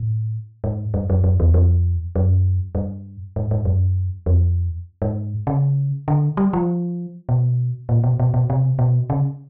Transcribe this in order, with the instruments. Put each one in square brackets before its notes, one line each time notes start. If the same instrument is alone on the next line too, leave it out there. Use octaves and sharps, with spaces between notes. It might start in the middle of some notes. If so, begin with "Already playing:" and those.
Already playing: [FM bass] A2
G#2
G2
F#2
F#2
E2
F2
F#2
G2
G#2
G#2
F#2
F2
G#2
C#3
D3
G3
F3
B2
A#2
B2
B2
B2
C3
B2
C#3